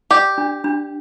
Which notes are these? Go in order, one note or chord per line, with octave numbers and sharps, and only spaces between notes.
G4 D5
D4
D4